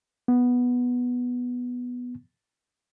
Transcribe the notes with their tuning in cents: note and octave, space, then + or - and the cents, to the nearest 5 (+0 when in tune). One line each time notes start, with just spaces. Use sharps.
B3 -5